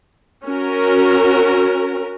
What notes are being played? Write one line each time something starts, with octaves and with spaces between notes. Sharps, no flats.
C#4 F#4 A#4